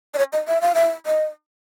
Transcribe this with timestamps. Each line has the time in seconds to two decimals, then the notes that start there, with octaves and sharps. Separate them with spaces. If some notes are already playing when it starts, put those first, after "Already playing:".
0.14 D5
0.18 C#5
0.33 D#5
0.48 E5
0.62 F5
0.75 E5
1.06 D#5